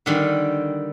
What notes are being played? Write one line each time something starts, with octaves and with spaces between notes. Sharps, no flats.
D3 D#3 G3